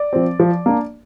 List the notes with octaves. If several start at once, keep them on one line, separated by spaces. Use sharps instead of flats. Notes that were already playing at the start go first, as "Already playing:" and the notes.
Already playing: D5
F3 C4
F3
A#3 D4